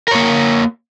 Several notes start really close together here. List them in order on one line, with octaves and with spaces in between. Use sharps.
A#4 C#5 A#3